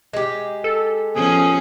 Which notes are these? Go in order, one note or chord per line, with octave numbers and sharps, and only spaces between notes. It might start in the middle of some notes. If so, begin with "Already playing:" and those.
G#3 G4
A4
F3 B3 C#4 G#4